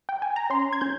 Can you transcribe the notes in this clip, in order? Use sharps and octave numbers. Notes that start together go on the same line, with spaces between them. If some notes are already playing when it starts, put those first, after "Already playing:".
G5
G#5
A#5
C#4 C6
G#6
C#4 G6